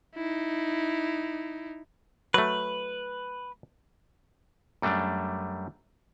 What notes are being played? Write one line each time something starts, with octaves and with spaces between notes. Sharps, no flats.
D#4 E4
F#3 A3 B4
F#2 G3 A3 D4